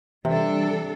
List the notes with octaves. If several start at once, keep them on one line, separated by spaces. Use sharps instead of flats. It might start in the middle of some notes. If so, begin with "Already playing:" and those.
C3 E3 G3 D4 A4